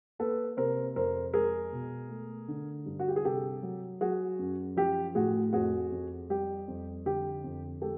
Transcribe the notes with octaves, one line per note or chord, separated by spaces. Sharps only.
A#3 A4 B4
C3 A#4 C5
F2 A#4 C5
G#3 G#4 A#4
B2
A3
D3
G2
F#4
G4
G#4
C3 G4 A4
F#3
F#3 F#4 G#4
F#2
F3 G4
A2 F#4 G#4
F2 F#4 G#4
F2
G3 G4
F2
D3 G4
F2
G#3 G4 A4